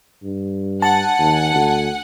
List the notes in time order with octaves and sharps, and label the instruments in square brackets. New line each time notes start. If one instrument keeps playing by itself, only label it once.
[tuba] G2
[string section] F#5 G#5 [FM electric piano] A5
[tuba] D#2
D2